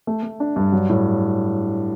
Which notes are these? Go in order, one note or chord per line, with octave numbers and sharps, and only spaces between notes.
A3
A3
D4
G2
F#3
A2